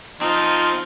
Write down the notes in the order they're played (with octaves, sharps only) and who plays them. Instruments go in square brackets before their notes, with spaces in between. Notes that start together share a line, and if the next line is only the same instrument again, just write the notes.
[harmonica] F3 D#4 [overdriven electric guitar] C4 F4